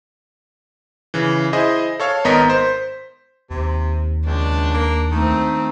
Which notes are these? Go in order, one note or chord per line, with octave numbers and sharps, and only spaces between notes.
C#3 E3
E4 G#4 C5 D#5
A4 C#5 F5
G#1 B3 A#4 D#5 B6
C5
D#2 C3
C#2 D4
A#3
D#3 A3 C4